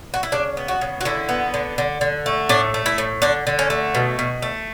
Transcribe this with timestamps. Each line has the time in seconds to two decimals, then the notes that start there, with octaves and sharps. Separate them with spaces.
0.14 F#4
0.23 E4
0.32 C#3 D4
0.57 B3
0.68 F#4
0.81 C#3
1.01 F#4
1.05 D3 E4
1.29 B3
1.54 D3
1.78 D3
2.01 D3
2.26 A3
2.49 A2 D4
2.74 A3
2.86 E4
2.98 A2
3.22 D3 D4
3.47 D3
3.59 C#4
3.70 A3
3.95 B2
4.19 B2
4.42 A3